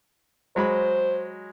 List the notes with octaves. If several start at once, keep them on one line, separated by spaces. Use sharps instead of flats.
F#3 G#3 C5 B5